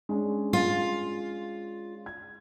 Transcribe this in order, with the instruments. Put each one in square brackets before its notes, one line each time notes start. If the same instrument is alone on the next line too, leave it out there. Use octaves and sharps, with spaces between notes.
[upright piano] G#3 C#4 D4
[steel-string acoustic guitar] F4
[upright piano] G#6